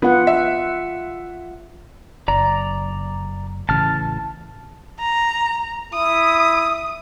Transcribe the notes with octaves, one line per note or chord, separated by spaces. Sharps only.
B3 F4 F#5
E5
F#1 D5 A#5
A1 C#3 E3 A5 F6
A#5
E4 D#6